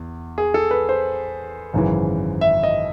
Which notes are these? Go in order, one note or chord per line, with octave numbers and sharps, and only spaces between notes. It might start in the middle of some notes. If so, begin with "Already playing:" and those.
Already playing: E2
G#4
A4
B4
C5
G#1 F#2 C#3 E3
E5
D#5